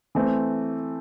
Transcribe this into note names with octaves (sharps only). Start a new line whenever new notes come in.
E3 A3 C4